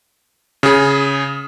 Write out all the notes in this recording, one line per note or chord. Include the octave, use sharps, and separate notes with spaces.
C#3 G#4